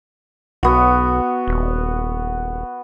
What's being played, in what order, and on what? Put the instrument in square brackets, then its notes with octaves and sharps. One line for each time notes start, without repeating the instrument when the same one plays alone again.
[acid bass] B1 [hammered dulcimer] B3 F#4
[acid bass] D#1